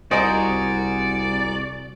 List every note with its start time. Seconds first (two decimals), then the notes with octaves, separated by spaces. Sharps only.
0.11 C2 F#4 G#4 A#4 C5 D5 D#5